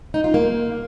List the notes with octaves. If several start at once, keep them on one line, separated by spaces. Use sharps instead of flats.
D#4
F4
A#3